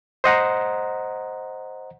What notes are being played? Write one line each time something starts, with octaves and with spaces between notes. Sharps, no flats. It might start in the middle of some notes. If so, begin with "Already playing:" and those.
C5 D#5 F#5 A#5